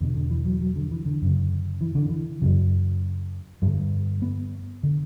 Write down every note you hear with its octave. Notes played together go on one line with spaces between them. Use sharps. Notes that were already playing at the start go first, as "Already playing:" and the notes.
E2 B2 D3
D3
E3
F#3
F#3
D3
E3
D3
F#2 C#3
E3
D3
E3
F#2 C#3 F#3
G2 D3 G3
B3
D3